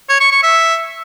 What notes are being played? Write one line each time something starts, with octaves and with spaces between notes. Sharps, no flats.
C#5
C#6
C#6
E5